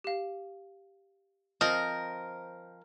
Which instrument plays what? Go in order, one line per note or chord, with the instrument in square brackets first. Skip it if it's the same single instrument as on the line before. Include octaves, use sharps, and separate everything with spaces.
[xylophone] G4 F5
[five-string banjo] F3 C4 D#5 [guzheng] A#4